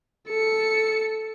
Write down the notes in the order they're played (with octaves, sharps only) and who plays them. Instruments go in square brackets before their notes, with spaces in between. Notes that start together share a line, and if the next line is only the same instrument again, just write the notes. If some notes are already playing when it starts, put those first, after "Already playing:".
[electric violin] A4 C#7